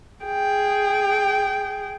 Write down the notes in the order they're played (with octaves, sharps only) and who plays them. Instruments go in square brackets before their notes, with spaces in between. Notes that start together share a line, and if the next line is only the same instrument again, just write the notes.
[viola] G#4 G5